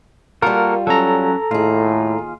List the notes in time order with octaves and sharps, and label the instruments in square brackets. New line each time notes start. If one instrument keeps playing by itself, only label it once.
[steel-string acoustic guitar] G3 F4 [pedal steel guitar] A#3 F#4 A4 [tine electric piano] A#4
[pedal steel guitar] F#3 C#4 [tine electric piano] A4 A#5
[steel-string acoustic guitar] D#2 G#4 [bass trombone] A2 [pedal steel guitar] F4